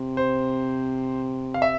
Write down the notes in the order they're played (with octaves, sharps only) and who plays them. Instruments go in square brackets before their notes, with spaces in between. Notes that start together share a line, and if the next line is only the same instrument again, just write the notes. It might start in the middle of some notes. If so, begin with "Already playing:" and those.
Already playing: [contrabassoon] C3
[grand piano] C5
F5
E5